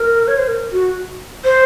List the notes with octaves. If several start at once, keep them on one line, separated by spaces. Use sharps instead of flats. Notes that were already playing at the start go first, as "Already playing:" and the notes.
Already playing: A#4
C#5
C5
A#4
F#4
C5